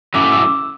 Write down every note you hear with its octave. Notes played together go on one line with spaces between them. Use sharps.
F#3 A3 C#4 E4 D6
E6